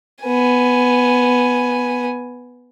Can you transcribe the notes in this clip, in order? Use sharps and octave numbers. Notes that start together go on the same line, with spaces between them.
B3 G#5